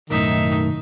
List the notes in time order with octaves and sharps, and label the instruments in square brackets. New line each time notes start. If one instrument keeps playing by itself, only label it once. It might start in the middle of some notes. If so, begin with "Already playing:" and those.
[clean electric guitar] B1 F#2 A2 [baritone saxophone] D#3 [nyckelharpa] D#4 E5